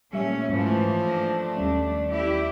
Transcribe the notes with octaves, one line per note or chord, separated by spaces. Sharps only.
A#2 G3 A3 C#4 E5
G#2 E3 F3 A3
A3 D4 A#6
D#2 G3 C#4 D5
E4 G4